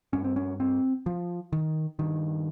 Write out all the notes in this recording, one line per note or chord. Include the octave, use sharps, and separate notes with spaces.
G2 C#4
C4
C#4
C4
F3
D#3
G2 D#3